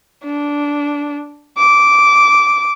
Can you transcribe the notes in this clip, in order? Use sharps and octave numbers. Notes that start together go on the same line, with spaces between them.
D4
D6